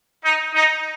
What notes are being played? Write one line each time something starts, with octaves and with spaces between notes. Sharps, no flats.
D#4
D#4